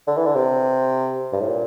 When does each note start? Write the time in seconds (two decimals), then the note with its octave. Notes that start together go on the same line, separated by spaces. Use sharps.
0.07 D3
0.17 E3
0.26 D3
0.36 C3
1.33 G2
1.41 A2
1.48 A#2